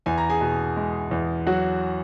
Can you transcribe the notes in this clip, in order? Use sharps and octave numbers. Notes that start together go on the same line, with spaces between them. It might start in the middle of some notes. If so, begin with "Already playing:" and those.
E2 G#5
A#5
G#4 G#5
B2
G#3
E2
F#3 F#4 F#5